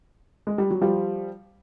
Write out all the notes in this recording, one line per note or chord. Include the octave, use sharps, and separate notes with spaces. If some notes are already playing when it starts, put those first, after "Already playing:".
G#3
G3
F#3
F3 G3